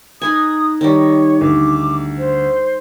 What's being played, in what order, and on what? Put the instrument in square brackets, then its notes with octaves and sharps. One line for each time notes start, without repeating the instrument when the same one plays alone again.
[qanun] D#4 B4 G#5 [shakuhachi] D#6
[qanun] D#3 G3 [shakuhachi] C#5
[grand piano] D2 [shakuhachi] D6
[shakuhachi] C5